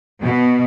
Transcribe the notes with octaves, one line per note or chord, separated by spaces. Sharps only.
B2